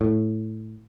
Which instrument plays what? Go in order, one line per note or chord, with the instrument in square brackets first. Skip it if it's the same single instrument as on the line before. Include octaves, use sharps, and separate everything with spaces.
[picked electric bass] A2